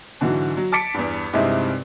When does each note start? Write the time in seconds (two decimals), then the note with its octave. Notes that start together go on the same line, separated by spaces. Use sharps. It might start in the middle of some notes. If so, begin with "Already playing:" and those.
0.21 G#2 D3 E3 F#3 F#4
0.57 F#3
0.72 A5 D6 A6 B6 C#7 D7
0.94 E2 G2
1.33 G2 C3 G#3 C4 D#4 E4